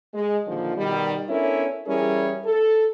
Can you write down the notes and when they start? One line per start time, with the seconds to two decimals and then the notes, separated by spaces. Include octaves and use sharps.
0.13 G#3
0.47 A#2 D3 D#3 F3
0.76 B2 D#3 G3
1.28 B3 C#4 D4 E4 A4 A#4
1.87 E3 G3 C#4 E4 G#4 A#4
2.45 A4